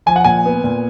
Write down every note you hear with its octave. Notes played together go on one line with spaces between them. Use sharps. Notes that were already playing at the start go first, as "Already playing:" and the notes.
F3 G#5
F#5
A#2 G#5
B3
A#2